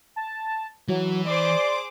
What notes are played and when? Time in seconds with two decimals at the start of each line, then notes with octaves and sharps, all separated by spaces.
0.16 A5
0.88 E3 F#3
1.27 G#4 C5 D5 C6 D6